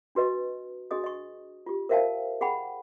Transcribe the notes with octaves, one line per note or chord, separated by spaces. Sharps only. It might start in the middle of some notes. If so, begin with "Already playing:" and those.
D4 F#4 B4 D#5 C#6
D4 F#4 G#4 D#5 D#6
D#5 C#6
F4 G4
A#4 C5 E5 F5 G5 A5
G#4 F#5 G5 B5